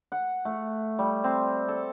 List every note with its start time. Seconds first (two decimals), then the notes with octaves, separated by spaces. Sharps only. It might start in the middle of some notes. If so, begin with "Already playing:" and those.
0.12 F#5
0.45 A3
0.99 G3
1.24 C4
1.68 A4